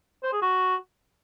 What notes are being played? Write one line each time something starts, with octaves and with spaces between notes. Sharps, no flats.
C5
G#4
F#4